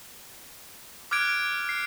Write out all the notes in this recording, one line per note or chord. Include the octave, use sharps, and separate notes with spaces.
D6 F6 F#6 G#6 D7
C7